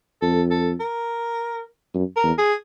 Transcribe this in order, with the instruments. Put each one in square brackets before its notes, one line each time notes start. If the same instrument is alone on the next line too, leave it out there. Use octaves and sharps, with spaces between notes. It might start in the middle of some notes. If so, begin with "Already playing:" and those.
[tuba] F2 [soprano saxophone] A4
[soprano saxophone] A4
A#4
[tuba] F#2
[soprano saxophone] A#4
[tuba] E2
[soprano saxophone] G#4